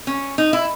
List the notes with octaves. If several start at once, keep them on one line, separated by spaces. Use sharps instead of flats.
C#4
D#4
E4